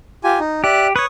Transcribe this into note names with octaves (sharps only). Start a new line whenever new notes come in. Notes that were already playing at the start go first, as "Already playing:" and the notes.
F4 G4 G#5
D#4
G4 D5 E5 F#6
B4 C#5 C#6 D#6